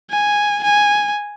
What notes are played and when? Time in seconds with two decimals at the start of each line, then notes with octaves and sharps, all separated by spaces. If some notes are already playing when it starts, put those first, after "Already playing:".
0.11 G#5
0.64 G#5